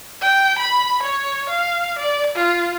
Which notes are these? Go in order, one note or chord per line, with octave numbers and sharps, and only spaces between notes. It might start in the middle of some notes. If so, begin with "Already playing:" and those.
G5
B5
C#5
F5
D5
F4